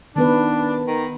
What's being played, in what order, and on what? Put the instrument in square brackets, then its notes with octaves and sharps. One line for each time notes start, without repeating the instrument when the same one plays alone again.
[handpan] D#3 B3 B4 [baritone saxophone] D4
[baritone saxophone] D#3